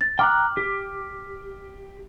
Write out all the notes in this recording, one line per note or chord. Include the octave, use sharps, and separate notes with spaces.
A6
G5 A#5 D6 F6 F#6
G4